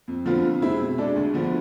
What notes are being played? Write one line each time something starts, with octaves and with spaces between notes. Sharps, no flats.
F2
D3 F3 B3 F4
F2
C3 G#3 C4 E4
B2
G#3 D4 A4 D5
D2
D3 F3 B3